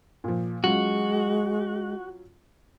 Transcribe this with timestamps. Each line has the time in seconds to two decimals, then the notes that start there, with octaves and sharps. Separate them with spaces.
0.24 A#2 F3
0.64 F#3 G#3 C#4 F4 F#4